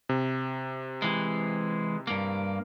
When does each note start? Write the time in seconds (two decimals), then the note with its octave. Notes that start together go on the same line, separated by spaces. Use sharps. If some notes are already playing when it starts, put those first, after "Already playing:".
0.09 C3
1.02 E3 G#3
2.07 G2 A#3